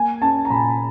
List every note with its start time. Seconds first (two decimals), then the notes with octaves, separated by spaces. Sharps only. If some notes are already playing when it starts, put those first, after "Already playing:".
Already playing: A#3 G#5
0.21 C#4 A5
0.45 A#5
0.50 A#2 B5